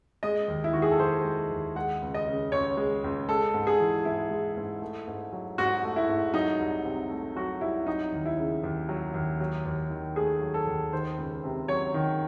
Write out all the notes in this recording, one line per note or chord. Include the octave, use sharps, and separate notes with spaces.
G#3 D#5
D#2
E4
D#3 F#4
G#4
A4
D#2 C5
G#3
D#2
G#3 F#5
C#2
D#5
C#3
C#2 C#5
G#3
C#2
G#3 A4
G#2
G#4
E3
G#2 E4
G#3
G#2
A3
G#2
F#3
G#2 F#4
A3
E4
G#2
F#3 D#4
C2
C3
A3
F#3 F#4
C2 E4
F#3 D#4
D#2
E4
C#3
D#2
F#3
D#2
F#3
D#2
D#3
A3 G#4
F#3
A4
D#2
D#3 C5
C#2
C3
F#3 C#5
D#3